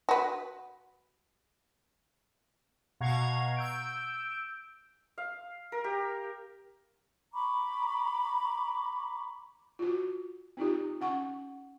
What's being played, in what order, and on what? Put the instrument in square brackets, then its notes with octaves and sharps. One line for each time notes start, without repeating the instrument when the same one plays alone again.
[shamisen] F#4 B4
[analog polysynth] B2 F5 F#5 A#5 C#6 G#6
E6 G6 D7
[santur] F5
A#4
G4
[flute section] A#5 B5 C#6 D6
[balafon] F4 F#4
C4 D#4 F4 G4
C#4 F#5 C#6